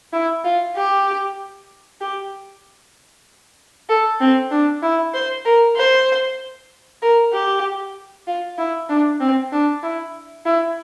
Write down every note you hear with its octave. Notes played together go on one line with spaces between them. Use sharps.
E4
F4
G4
G4
A4
C4
D4
E4
C5
A#4
C5
A#4
G4
F4
E4
D4
C4
D4
E4
E4